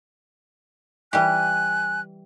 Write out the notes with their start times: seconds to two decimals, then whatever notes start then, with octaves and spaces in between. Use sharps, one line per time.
1.13 E3 G3 G4 G#5 F#6